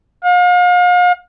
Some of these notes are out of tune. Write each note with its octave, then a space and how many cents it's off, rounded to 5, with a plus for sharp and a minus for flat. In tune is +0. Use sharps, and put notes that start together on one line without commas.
F5 +40